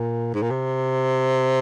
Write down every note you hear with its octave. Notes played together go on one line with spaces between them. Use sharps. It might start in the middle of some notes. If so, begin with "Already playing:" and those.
Already playing: A#2
G#2
A#2
C3